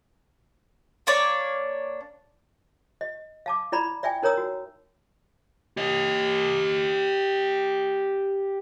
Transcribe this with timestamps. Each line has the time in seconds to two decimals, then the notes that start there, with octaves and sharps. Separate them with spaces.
1.07 A#3 D4 C#5 D5
3.01 D#5
3.46 F5 A5 D6
3.72 E4 D5 A#5 B5
4.03 D5 E5 G5 G#5
4.23 D#4 A#4 C#5 A#5 D#6 E6
4.37 F#4
5.77 G4 D#5